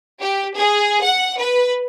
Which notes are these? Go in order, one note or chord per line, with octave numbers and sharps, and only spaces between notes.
G4
G#4
F#5
B4